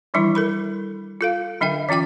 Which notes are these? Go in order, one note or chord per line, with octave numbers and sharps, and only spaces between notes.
D#3 E3 G3 D4 E4
A4 A#4 B5
F4 A4 F5
D3 F#3 D4 E5 G5
E3 C#4 F4 G5 D6